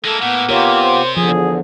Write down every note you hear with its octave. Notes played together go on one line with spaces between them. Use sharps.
G#3 A#3 E4 A4
A2 B3 F#5
C3 B3 F4 G4 A#4 C#5
C5
E2 D3 F3 G#4